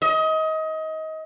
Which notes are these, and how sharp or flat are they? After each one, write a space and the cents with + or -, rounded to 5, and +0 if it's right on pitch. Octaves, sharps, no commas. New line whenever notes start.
D#5 +25